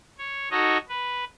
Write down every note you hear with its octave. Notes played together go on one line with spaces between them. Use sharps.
C#5
D#4 F#4 A4 C#5 D#5
B4